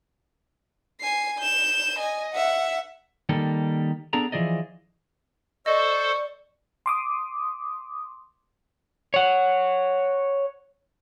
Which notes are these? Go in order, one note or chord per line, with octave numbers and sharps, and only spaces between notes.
G#5 C7
G6 E7
D#5 G#5
E5 F#5
D#3 G3 A#3 A4
B3 D4 G#4 A4 D5 A#5
E3 F3 G#4 D5 D#5
A4 C5 D5 D#5 C#6
C6 D6 D#6
C#5 F#5